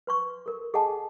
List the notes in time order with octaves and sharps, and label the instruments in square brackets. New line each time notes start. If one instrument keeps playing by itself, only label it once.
[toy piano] B4 C6 C#6
A4 A#4
G#4 A4 D#5 F#5 G#5 A5